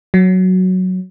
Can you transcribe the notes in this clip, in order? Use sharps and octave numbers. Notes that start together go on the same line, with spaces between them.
F#3